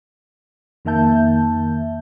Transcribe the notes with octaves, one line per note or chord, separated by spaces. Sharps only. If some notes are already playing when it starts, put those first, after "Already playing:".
F2 D#3 A#3 E5 A5 G6